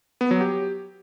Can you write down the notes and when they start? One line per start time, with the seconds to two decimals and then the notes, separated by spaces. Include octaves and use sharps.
0.21 B3
0.31 F#3
0.41 G4